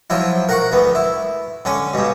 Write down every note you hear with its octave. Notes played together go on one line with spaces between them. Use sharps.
F3 F#3 E4
A#4 F#5 C#6
D2 B3
E4
D3 C#4
G2 B2